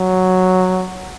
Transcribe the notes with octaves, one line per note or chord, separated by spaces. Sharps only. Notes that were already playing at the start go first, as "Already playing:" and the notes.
Already playing: F#3